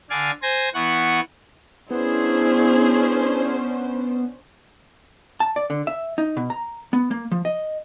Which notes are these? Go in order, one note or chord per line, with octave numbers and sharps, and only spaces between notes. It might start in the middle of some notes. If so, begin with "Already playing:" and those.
D3 D5 F5 G#5
C5 G#5 A#6
E3 B3 F#5 C#6
B3 C#4 D4 E4 G#4 C5
A5
D5
D3
E5
D#4
B2
A#5
B3
A#3
F3
D#5